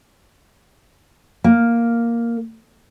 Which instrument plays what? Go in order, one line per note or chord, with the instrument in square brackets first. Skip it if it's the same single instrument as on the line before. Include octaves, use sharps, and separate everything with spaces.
[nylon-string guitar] A#3